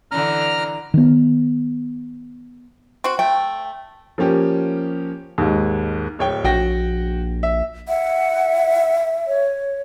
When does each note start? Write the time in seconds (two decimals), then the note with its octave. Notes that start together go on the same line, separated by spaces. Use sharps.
0.12 D3 E3 A#5 F6
0.94 D#3 B3
3.04 C4 F#4
3.19 A3 G5
4.18 F3 A#3 C#4 G4
5.38 D#2 G#2
6.19 D1 C#5 G5
6.44 A#1 F#4 G5 A#6
7.43 E5
7.88 E5 F#5
9.27 C#5